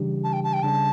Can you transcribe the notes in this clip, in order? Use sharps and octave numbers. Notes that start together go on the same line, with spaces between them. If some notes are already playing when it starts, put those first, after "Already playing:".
Already playing: C#3 E3 G3 D4 G4
A5
G5
A5
G5
C#3 G3 D4 A5